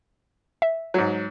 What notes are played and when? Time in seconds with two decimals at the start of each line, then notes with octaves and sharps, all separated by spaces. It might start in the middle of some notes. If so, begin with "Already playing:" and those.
0.62 E5
0.94 G#2 F#3